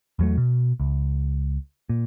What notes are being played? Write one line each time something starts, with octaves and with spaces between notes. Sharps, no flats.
E2 F#3 A3
B2
C#2
A#2